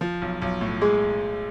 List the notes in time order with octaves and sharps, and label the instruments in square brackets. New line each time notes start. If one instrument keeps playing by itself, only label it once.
[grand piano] F3
B1
B1
A2
[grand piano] G#3 [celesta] G#4